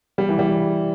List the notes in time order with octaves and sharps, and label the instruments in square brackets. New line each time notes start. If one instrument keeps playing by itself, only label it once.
[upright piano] G3
E3
G3